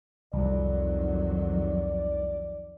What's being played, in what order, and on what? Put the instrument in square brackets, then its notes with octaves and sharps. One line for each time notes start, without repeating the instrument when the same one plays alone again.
[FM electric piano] C2 [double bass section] F2 D#3 F#3 [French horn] D5